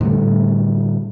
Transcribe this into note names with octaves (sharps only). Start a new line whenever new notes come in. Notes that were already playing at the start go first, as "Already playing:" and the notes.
A2 D3 G3 A3